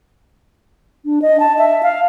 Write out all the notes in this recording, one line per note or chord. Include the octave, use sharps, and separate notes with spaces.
D4
D#5
A5
E5
F5